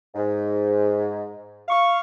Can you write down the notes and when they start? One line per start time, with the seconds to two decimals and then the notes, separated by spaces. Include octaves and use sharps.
0.15 G#2
1.69 F5 C#6